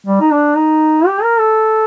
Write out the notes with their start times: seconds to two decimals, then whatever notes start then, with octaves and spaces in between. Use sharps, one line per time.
0.07 G3
0.21 D#4
0.32 D4
0.57 D#4
1.07 G4
1.23 A#4
1.39 A4